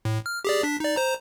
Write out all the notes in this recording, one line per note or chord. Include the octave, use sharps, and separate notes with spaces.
A2
F6
G4 G#4 D5
D4 B6
D#4 D5
C5 A#5